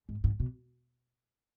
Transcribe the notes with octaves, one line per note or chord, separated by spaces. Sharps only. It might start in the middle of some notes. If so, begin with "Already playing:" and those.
G#2
G#2
B2